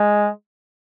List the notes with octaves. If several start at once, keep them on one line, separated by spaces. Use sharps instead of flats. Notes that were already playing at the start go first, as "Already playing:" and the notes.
Already playing: G#3